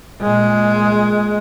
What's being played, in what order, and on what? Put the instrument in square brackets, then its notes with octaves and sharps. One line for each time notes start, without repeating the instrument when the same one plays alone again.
[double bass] A#2 G#3